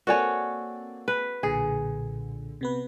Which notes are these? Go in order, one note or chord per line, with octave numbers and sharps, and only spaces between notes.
A#3 C4 F#4 A4 C#5 D5 G#5
B4
B1 A#2 D3 G#4
C3 B3 B4